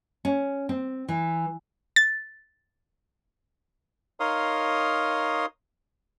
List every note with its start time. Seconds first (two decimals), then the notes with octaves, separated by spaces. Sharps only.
0.25 C#4
0.69 C4
1.08 E3
1.96 A6
4.20 D#4 A#4 C#5 F5 C6 D#6